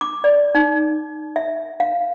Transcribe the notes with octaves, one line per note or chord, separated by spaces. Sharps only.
D6
D5
D#4
E5
F5